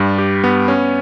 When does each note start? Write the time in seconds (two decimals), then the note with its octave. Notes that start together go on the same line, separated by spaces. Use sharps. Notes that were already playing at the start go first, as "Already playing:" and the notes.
Already playing: G2 G3
0.18 G4
0.44 B3
0.68 C#4